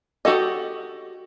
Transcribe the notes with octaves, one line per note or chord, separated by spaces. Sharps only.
F#4 G4 A4 D#5